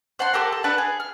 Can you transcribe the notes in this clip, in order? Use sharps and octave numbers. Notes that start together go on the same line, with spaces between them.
C5 F#5 A5 C6
G4 A4 A#4
A4
D4 B4 F#5 A5
G#4
F6